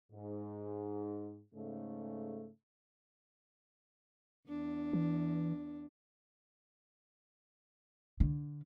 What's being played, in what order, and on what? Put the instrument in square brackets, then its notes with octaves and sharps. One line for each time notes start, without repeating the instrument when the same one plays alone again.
[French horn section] G#2
G#2 C#3 A3
[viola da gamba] E2 D4
[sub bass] E3
[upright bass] D3